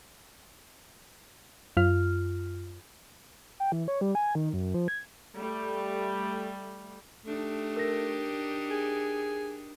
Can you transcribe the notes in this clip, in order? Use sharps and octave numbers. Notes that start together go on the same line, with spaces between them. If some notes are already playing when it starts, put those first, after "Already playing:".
F#2 F4 F6
G5
E3
C#5
G3
G#5
D#3
F#2
F3
G#6
G3 A3
A3 D4 D#4 G4
A#4 A#6
G#4